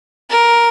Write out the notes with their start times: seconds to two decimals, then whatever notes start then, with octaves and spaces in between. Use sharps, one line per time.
0.30 A#4